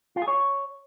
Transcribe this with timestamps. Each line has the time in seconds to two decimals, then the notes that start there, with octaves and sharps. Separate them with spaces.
0.16 F4
0.22 G#4
0.28 C#5